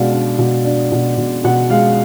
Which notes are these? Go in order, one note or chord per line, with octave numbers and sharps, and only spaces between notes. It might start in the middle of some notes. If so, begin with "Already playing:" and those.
Already playing: B2 G#3 D4 D5 F5
D4
B2
D4
B2
B2
B2 F#5
G#3 F5